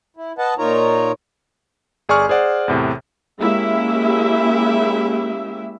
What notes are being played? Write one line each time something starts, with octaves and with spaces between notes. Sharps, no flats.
E4
B4 D#5 F#5 A5
A#2 D#4 F4 A#4 C#5 A#5
G1 G#4 D5 G#5 C#6 F6
G#4 C5 D5 F#5
E2 A2 C3
G#3 A#3 C#4 E4 G4 E5